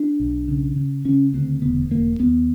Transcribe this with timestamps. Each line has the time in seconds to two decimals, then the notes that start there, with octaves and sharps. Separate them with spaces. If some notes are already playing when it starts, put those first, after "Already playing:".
Already playing: D4
0.20 B1
0.48 C#3
0.76 C#3
1.05 C#3 C#4
1.33 D2 C4
1.62 E1 B3
1.91 E1 A#3
2.20 D#2 B3